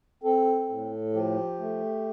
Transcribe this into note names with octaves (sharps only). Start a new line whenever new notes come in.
C4 A4
A2
F3 G4
A3